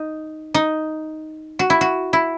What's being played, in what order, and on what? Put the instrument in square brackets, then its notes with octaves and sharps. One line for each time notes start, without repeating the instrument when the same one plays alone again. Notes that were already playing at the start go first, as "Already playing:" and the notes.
Already playing: [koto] D#4
D#4
F#4
E4
F#4
E4